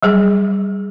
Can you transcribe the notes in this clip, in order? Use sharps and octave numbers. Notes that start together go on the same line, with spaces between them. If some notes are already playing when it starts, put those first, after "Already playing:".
F#3 G3 G#4